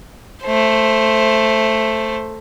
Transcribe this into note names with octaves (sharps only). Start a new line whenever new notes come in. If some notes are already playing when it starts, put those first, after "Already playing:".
A3 C5